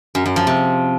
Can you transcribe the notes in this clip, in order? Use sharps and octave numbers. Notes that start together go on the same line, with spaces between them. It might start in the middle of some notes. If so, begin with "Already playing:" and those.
F#2
F#2
F3
C3